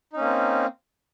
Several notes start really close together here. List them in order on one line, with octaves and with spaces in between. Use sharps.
D#4 C#4 A#3 C4